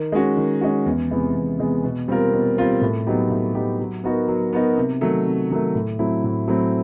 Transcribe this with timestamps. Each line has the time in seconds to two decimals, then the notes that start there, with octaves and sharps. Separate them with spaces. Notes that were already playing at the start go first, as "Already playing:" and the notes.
Already playing: D#3
0.12 G#3 C#4 F#4
0.37 D#3
0.61 G#3 C#4 F#4
0.86 E2
1.11 C3 E3 G#3 B3
1.35 E2
1.59 C3 E3 G#3 B3
1.84 B2
2.08 G3 C4 F4 A#4
2.33 B2
2.57 G3 C4 F4 A#4
2.81 A2
3.07 F#3 B3 D#4 G4
3.30 A2
3.55 F#3 B3 D#4 G4
3.80 F#3
4.04 B3 D#4 F#4 A#4
4.28 F#3
4.53 B3 D#4 F#4 A#4
4.77 C3
5.01 D#3 F#3 A3
5.26 C3
5.50 D#3 F#3 A3
5.75 A2
5.99 F#3 A3 C4 E4
6.24 A2
6.48 F#3 A3 C4 E4